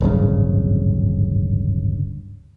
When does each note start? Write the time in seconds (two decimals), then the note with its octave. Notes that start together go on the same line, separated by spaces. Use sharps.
0.01 D1 G#1 G2 C#3